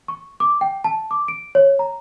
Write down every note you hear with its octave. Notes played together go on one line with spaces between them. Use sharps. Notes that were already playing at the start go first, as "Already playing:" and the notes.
C#6
D6
G5
A5
D6
D7
C#5
A#5